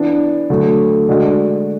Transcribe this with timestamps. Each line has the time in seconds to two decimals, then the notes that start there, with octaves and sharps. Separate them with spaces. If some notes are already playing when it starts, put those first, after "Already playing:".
Already playing: E3 B3 D4
0.50 D3 F#3 A3
1.08 D3 G#3 D4 F#4